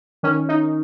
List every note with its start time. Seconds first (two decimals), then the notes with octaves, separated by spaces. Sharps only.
0.23 D#3 C#4
0.49 D#4